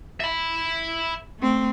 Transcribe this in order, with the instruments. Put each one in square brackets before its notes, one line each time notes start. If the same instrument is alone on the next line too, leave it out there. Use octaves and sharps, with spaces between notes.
[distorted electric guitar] E5 B5
[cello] A3 C4